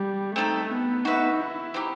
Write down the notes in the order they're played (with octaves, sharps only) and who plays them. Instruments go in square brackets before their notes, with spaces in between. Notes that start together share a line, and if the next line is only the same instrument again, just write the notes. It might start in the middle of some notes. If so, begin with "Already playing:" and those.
Already playing: [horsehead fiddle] G3
[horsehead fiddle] A3 [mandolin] C4 D#4 A4
[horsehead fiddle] B3
[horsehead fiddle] D#4 [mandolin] F#4 B4 E5
[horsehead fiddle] E4
[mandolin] C4 D#4 G4